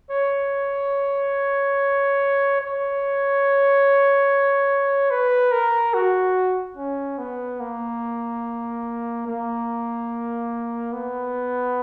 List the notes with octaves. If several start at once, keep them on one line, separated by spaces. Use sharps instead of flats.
C#5
C#5
B4
A#4
F#4
C#4
B3
A#3
A#3
B3